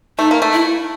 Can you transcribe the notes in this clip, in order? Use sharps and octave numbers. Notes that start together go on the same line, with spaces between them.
A3 D#4
A#3
A3
E4